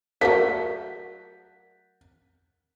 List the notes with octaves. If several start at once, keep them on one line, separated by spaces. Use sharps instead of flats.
F3 F#3 A3 A#4 D5 F#5 B6